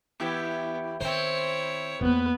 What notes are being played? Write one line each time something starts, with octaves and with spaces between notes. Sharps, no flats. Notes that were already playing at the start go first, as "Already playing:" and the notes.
E2 B3 E4 G4
D#3 C4 E4 C5 C#5
E2 A#3 B3 B4